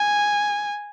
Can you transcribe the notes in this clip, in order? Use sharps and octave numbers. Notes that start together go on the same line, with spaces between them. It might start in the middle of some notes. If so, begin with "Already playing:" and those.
Already playing: G#5